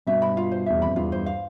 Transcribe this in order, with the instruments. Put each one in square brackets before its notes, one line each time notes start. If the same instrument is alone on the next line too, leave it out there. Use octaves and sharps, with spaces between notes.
[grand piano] G2 B2 [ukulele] E5
[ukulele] B5
F4
C5
[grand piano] E2 [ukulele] E5
[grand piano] F2 [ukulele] B5
[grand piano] E2 G2 [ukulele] F4
[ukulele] C5
F5